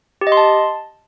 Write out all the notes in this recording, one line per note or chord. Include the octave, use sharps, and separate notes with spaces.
G4
D#5
C6
A5